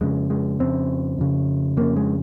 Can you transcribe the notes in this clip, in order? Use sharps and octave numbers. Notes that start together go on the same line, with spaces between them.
F2 C#3 G#3
G#3
F2 C#3 C4
F2 C#3
F2 C#3 A#3
G#3